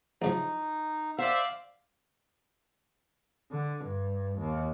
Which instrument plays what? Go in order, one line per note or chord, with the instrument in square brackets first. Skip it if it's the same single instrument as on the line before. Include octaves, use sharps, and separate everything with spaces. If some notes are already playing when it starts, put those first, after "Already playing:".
[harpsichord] A1 C#3 F3 [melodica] D#4
[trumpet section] C5 D5 E5 [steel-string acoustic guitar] F5
[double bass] D3
G2
D#2